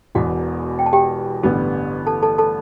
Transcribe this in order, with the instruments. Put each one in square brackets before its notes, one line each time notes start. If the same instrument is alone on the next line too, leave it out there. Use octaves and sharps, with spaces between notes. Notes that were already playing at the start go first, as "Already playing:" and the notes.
[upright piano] E1 E2 B2 [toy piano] F#4 F#5
[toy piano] G5
A5
G4 G5
[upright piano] A1 G2 D3 G3 B3
[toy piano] A4 A5
A4 A5
A4 A5